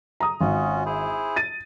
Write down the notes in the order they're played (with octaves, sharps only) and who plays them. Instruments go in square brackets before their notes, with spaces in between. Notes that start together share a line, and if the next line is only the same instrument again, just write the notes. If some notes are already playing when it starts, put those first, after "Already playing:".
[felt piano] A#5 D#6
[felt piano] G#1 [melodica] C#4 F4 F#4
[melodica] E4 G#4 C5
[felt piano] A6 D#7